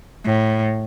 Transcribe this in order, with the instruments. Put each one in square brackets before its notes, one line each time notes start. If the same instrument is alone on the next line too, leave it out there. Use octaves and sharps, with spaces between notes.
[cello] A2